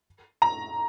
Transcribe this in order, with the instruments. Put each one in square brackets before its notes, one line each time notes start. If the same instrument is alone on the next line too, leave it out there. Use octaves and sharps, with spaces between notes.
[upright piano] A#5